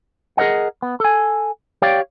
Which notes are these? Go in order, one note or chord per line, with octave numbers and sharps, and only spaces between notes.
G#4 A#4 C#5 D#5 F#5
B3
A4 G#5
G4 C#5 D5 F5 G5